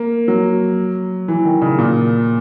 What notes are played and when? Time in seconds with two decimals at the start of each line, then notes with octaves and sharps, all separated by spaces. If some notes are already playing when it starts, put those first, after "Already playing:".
Already playing: A#3
0.28 F#3
1.28 E3
1.45 D#3
1.62 C#3
1.78 A#2